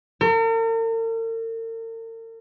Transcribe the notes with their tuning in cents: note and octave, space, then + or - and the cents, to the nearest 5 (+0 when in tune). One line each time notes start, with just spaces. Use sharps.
A#4 -45